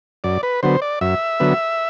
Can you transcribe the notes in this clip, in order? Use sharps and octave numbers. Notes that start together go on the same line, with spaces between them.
F#2 D5
B4
D3 F#3 B3 C5
D5
F#2 E5
D3 F#3 B3